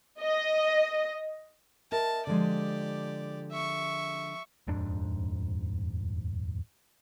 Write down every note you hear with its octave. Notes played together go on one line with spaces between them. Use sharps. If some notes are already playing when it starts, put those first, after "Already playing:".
D#5
A#4 D#5 E5 A5
D3 F3 G#3 G4 D5
E5 C#6
D#1 F2 G#2 D4